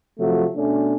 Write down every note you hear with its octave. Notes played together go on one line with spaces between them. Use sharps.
C3 F3 F#3 A3
B2 A3 C#4 D4